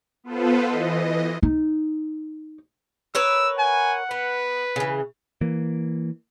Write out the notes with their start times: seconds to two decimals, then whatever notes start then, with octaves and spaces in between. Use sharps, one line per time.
0.24 B3 F4 A4 B4 C5
0.66 E3 D#5
1.43 D#4
3.15 A#4 B4 C#5 E6
3.59 F#5 G#5
4.11 B3 B4
4.76 C#3 E3
5.41 E3 A#3